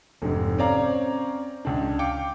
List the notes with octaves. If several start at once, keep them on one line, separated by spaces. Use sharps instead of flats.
F1 G#2
C4 C#4 C#5 D5 F5 A#5
C#2 D4
F5 G5 D6 C#7